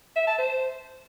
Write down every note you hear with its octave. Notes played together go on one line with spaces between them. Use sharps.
E5
A5
C5